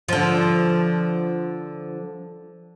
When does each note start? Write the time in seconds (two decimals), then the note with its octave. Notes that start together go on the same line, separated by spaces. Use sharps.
0.09 D3 F3